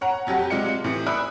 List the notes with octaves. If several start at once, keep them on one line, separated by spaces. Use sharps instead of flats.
C#5 F#5 A#5
F2 F#3 G4 F#5
C3 G#3 F4 D5 F5 C#7
A2 C3 E3
D5 E5 B5 D#6 F#6 D7